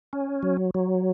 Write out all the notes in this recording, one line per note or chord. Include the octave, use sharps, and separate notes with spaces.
C#4
F#3
F#3